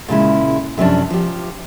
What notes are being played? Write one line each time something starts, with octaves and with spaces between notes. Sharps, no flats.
A#2 C#3 G#3 E4
F#2 C3 F3 C#4 D4
F3 G4